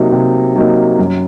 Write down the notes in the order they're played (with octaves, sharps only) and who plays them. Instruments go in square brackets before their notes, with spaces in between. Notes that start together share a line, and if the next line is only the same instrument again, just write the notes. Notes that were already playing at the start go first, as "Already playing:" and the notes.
Already playing: [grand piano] C3 F#3 A#3 D#4
C3
F#3 A#3 D#4
F#2